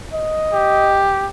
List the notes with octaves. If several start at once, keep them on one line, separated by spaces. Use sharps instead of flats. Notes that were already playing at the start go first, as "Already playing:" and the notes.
D#5
G4